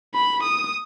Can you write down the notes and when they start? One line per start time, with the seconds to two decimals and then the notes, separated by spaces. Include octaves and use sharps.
0.14 B5
0.43 D#6